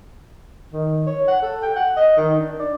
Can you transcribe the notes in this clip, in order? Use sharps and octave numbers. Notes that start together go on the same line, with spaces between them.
D#3
C#5
F#5
A4
G5
F#5
D#5
D#3
D4
D5